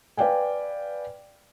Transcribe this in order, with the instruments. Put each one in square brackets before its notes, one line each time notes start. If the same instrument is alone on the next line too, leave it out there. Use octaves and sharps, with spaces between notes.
[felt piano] B4 D5 F5 G5 G#5